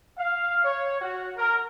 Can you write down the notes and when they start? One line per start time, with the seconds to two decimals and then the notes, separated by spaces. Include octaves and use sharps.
0.19 F5
0.65 C#5
1.02 F#4
1.37 A#4